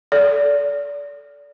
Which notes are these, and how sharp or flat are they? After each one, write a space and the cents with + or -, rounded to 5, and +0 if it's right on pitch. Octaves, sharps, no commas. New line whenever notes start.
A4 +0 D5 -30